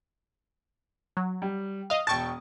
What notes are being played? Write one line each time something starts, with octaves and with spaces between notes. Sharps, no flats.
F#3
G3
D#5 F5 D#6
E1 G5 A5 C#6 A6